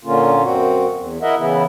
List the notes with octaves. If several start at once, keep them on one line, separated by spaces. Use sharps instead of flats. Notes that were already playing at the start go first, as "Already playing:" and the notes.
A#2 D3 A#3 C#4 F4
F#2 C4 F#4
E2
E4 A#4 D#5 E5 F#5
C#3 E3 B3 E4